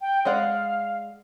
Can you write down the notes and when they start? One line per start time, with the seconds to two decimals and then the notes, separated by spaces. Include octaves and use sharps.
0.01 G5
0.25 G#3 D5 F5 F#5